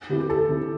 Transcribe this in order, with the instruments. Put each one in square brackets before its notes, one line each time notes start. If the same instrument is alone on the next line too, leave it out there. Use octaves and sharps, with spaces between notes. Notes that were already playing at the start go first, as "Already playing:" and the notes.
[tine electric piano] D3 C4 E4 [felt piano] G4
[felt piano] G4
[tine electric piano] D2 [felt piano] A4
[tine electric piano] D3 C4 E4